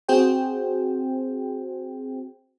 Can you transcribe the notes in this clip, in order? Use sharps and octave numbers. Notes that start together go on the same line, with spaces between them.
C4 F#4 G#4 C5 G5